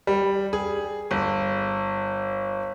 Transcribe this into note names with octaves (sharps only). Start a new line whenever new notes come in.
G3
G#4
G1